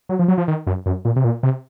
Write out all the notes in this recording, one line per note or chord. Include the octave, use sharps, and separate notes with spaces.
F#3
F3
F#3
F3
D#3
F#2
F#2
A#2
C3
A#2
C3